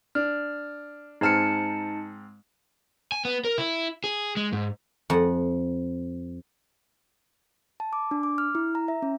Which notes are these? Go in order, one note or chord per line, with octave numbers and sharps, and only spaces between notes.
D4 F6
G#2 C4 D#4 A5 F6 C#7
G#5
B3
A#4
E4
G#4
G#3
G#2
F2 F#5
A5
D6
D4
D6
F6
E4
A#5
E5
C#4